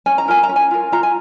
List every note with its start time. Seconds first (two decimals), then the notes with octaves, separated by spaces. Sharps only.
0.06 C#4 G#5
0.18 A#5
0.28 F4 A#4 G#5
0.43 A#5
0.49 C#4
0.56 G#5
0.71 F4 A#4
0.92 F4 A#5
1.03 G#5